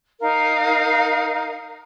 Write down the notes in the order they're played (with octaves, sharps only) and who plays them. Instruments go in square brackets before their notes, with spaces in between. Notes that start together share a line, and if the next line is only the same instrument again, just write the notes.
[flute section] D#4 A#4 F5